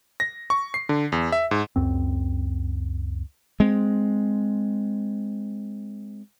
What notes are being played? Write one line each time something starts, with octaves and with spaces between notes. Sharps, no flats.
A#6
C#6
C7
D3
E2
E5
G#2
C#2 F#2 C4
G#3 C4